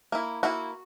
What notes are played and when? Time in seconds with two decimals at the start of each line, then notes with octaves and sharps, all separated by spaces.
0.12 A#3 E4
0.43 A#3 E4 F#4